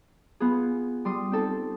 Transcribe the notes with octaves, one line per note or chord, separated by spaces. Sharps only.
B3 F4 G#4
G3 C6 D#6
C4 D#4 A4 A5